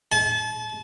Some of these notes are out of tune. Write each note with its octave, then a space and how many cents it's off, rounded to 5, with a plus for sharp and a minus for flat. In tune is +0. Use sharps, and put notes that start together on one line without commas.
A5 -35